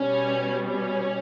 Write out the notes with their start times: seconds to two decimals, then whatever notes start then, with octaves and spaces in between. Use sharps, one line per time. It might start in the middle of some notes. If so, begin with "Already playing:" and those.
Already playing: B2 G3 C#4
0.66 C#4